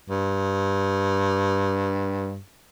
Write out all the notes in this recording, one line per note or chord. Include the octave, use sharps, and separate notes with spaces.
G2